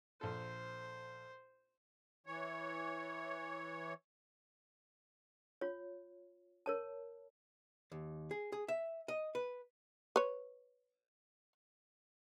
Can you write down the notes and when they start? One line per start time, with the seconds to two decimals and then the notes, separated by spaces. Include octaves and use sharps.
0.21 A#1 A4 C5
2.26 E3 C#5
5.61 F4 C#5
6.66 A#4 C#5 A5
7.92 D#2
8.31 G#4
8.52 G#4
8.68 E5
9.08 D#5
9.35 B4
10.16 B4 C#5